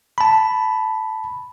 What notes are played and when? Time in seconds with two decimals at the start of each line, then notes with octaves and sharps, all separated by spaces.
0.18 A5 B5